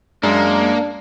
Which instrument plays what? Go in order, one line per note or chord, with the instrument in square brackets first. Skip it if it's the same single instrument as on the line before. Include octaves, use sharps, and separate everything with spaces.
[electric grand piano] F#2 G#3 [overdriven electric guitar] A#3 [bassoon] D4